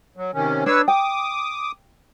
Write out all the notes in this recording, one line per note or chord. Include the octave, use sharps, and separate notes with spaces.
F#3
C3 D#3 C#4
D4 B4 C#5 E6
G5 D6 D#6